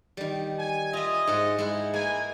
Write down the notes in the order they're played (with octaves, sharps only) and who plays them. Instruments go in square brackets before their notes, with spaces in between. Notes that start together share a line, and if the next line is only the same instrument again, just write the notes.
[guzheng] D#3 G3
[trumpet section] G#5
[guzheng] F4 E5 [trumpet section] D#5
[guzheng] G#2 G#3 F#5
G#3 E4 F#5
[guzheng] A#3 [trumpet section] B4 G#5